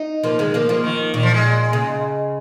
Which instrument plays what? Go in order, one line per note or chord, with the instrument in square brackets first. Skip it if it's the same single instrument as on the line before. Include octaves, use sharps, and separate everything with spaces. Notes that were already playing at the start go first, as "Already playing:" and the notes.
Already playing: [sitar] D#4
[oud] F3 A#3
D#3 G#3
F3 A#3
F3 A#3
[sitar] D#3
[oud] A#2 [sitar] D#3
[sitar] F3
G#3
[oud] C#3